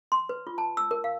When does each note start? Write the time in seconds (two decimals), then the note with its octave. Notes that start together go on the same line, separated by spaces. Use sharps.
0.12 C6
0.29 B4
0.47 F4
0.58 A5
0.77 E6
0.91 A#4
1.04 F5